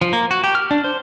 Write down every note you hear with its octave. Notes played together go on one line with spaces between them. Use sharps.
F3
A#3
F#4
G4
F6
D4
C5